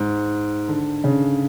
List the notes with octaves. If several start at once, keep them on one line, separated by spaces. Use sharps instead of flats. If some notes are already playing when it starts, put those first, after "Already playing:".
Already playing: G#2
D3
C#3